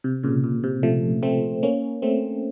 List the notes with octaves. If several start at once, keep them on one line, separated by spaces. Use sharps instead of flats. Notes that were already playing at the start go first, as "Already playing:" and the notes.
C3
A#2 C#3
A#2
C3
F3 A3
A3 C4
A#3 C#4
A3 C4